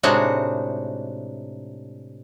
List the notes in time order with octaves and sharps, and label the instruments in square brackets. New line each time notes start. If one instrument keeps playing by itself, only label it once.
[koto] A2 C3 G#3 D4 D#4 F#4